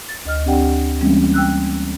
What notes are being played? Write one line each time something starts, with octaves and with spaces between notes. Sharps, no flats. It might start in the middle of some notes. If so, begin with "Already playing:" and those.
A6
D2 D#5 F6
C4 D4 G4 D5 F#5 G5
E3 G3 G#3 A#3 C4 C#4
G5 E6 F#6